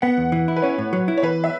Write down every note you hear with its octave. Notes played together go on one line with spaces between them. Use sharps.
B3 F#5
E2
E3
E4
B4
C#4 C#5
A2
F#3
E4
C#5
E3 B4
E5